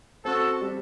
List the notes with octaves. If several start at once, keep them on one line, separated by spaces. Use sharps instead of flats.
C4 F#4 A4
G3